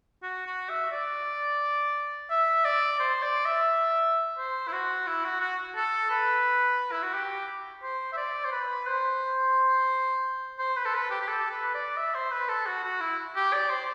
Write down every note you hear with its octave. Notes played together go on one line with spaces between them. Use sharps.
F#4
F#4
E5
D5
E5
D5
C5
D5
E5
C5
E4
F#4
E4
F#4
F#4
A4
B4
E4
F#4
G4
C5
E5
D5
C5
B4
C5
C5
B4
A4
B4
G4
G4
A4
B4
D5
E5
C5
B4
A4
F#4
F#4
E4
G4
D5
C5